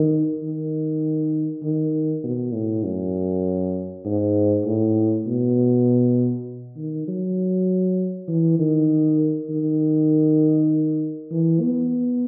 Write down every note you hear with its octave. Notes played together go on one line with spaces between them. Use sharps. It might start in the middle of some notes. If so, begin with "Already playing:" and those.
Already playing: D#3
D#3
D#3
B2
A2
F#2
G#2
A2
B2
D#3
F#3
E3
D#3
D#3
E3
B3